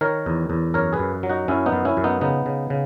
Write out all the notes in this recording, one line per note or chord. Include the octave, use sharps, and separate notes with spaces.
D#3 A#4 C#5
E2
E2
F#2 A#4 C#5
G#4 B4
F#2
F#3
D#4 F#4
F#2 C#4 E4
B3 D#4
F#2
C#4 E4
F#2
B3 D#4
C#3 B3 D#4
C#3
C#3